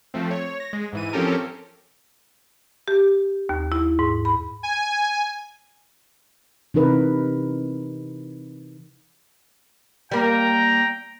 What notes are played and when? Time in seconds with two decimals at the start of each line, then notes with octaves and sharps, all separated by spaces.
0.14 F3 A3 C4
0.31 C#5
0.60 A#6
0.73 G#3
0.93 G#2 E3 D#7
1.13 F3 C4 C#4 G4 A4 A#4
2.88 G4
3.49 D#2
3.72 E4
3.99 G#2
4.25 B5
4.63 G#5
6.74 C3 E3 D#4 A#4 B4
10.12 G3 A#3 G5 A#5